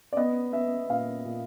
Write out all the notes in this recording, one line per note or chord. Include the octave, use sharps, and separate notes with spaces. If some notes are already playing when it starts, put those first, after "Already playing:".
D5
B3 D#5
B3 E5
A#2 F5
A#2